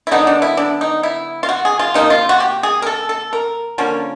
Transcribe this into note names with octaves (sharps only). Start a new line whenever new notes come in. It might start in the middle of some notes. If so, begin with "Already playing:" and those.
E4
D3 F#3 B3 D4 D#4
D4
E4
D4
D#4
E4
F4
F#4
G#4
F4
C3 F3 A#3 D#4
F4
F#4
G4
G#4
A#4
A4
A4
A#4
D3 F3 A#3 C#4